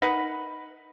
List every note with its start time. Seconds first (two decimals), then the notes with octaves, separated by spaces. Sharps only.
0.02 D#4 A#4 B4 F#5